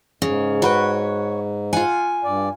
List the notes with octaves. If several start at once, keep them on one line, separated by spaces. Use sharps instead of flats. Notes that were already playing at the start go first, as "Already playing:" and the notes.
G#2 C#3
F#4 B4 C#5 G5
F4 F#5 G#5
G2 D5